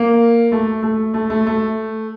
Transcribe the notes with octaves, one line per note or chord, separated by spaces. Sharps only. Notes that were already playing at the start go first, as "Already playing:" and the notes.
Already playing: A#3
A3
A3
A3
A3
A3